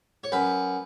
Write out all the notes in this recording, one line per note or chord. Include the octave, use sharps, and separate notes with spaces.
C#5
F#2 B4